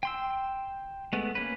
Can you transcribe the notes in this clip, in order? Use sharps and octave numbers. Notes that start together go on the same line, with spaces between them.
G5 C6 E6
G#3 A3 B3
A#3 C#4 B4